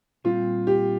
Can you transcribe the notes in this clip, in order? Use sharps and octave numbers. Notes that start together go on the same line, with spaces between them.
A#2 G3 C4 F4
G4